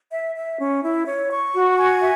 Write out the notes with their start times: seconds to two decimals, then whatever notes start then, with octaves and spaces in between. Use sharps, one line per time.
0.12 E5
0.35 E5
0.59 C#4
0.82 E4
1.06 C#5
1.31 C#6
1.54 F#4
1.77 G#5
2.00 E5